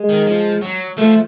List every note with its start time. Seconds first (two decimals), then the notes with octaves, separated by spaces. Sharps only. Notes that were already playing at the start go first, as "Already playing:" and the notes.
Already playing: G#3
0.09 D#3
0.27 F3
0.62 F#3
0.98 F3 A3